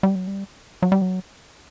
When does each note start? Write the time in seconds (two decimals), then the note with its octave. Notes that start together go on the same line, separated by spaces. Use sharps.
0.03 G3
0.15 F#3
0.27 G3
0.82 F#3
0.92 G3
1.01 F#3